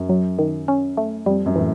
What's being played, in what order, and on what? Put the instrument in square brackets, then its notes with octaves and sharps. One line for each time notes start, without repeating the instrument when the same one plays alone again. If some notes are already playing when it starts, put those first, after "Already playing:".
Already playing: [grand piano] F#2
[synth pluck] F#3
D#3
C#4
A3
[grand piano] F2 [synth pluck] G3
[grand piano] F#2
[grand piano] A2 [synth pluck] E3